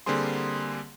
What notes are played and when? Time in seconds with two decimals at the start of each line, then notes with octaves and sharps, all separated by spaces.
0.06 D3 G3 A#3 C4 G#4 C6